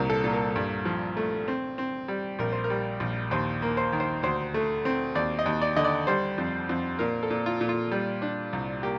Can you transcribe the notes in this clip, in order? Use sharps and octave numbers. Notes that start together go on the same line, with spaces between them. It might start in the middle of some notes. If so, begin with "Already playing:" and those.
Already playing: C2 A#2 A#4
A4
A#2
A#4
G2
F3
A3
C4
C4
G3
A#1 A#4
C5
A#4
G3
A#1
D#2 C5
A#3
C5
D#3
C5
D2 C5
A3
C4
D#2 D5
D#5
D#2
D5
D3 D#5
D5
G3 C5
F2
F2
A#2 A#4
A4
A#2
F4
A#2
F4
G3
D4
C2
A#3 G4